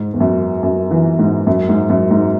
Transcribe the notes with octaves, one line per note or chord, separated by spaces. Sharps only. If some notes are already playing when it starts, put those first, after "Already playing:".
Already playing: G#2
E2
F#2
F#2
E3
G#2
F#2
G#2
F#2
G#2